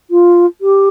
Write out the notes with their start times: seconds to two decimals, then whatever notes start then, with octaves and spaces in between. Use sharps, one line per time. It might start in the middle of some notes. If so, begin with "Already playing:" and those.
0.10 F4
0.61 G4